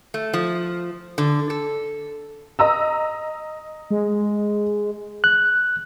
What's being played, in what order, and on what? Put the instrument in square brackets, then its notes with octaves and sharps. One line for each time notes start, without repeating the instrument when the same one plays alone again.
[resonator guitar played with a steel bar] A3
F3
D3
A4
[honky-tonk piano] D#5 A#5 E6
[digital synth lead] G#3
[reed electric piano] F#6